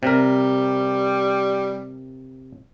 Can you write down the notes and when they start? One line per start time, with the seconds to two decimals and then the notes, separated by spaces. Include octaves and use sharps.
0.03 C3 G3 A#4